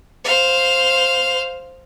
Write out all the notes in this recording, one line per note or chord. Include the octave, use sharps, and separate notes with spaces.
C5 F5